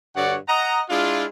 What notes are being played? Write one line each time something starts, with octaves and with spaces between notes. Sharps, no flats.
G2 D3 F#4 C#5 D5 F#5
D#5 F#5 A#5
G#3 D4 E4 F4